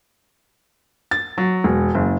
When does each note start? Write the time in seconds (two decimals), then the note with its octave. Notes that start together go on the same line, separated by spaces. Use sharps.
1.11 A6
1.38 F#3
1.64 E1
1.95 F#1